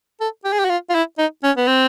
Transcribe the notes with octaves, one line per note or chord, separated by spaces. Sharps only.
A4
G4
G#4
G4
F#4
F4
F4
E4
D#4
C#4
B3
C4